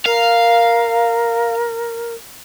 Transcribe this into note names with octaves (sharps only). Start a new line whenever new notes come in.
A#4 F5